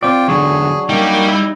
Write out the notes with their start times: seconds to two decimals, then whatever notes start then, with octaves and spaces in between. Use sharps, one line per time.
0.03 C4 F4 D5 G5
0.28 E2 D3 F#3 D4 G#4 C#5
0.89 F#2 G3 A#3 D#4 G5
1.28 E4